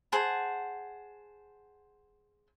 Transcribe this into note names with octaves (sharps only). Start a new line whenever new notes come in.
G#4 C5 F#5 A5